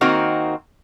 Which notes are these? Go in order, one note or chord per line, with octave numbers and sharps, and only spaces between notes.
D#3 A#3 C4 D#4 F#4 A#4